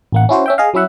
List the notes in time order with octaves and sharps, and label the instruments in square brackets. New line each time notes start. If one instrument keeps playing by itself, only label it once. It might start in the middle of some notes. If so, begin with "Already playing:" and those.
[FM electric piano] A1 A#3 F#5
C#4 E4 F#4 C5
C#4 E5 G5
G#4 D#5 F5
F#3 C#4 E4 E5 F#5